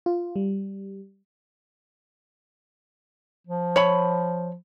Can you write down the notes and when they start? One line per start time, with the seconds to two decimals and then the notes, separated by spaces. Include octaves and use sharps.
0.06 F4
0.36 G3
3.47 F3
3.76 C#5 B5